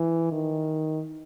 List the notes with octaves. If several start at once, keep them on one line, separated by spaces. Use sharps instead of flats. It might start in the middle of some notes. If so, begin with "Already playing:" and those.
Already playing: E3
D#3